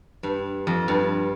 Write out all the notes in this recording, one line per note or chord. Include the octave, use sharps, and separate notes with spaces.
G2
F2
G2